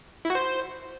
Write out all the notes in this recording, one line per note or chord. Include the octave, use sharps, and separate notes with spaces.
E4
F#4
C5